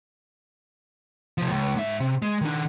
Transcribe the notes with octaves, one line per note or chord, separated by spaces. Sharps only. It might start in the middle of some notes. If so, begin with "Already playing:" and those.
C3 F3
C#2
G#2 E5
C3
G#3
D#3 D4